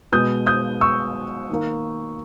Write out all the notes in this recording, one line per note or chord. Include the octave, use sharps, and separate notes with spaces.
B2 G#3 B3 D#6 G6
D#6 G6
C#6 E6
D#3 A#3